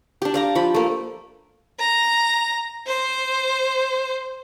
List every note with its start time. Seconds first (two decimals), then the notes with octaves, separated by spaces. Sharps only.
0.22 D4 G4
0.34 D5 F5 A#5
0.55 F3 B5
0.74 A3 A#3
1.79 A#5
2.87 C5